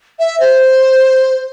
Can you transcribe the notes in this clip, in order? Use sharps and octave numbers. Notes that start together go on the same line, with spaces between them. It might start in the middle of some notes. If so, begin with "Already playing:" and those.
E5
C5